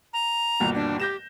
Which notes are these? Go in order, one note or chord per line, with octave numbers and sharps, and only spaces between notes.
A#5
G1 D#2 B2
D4
G4 G6 A#6 E7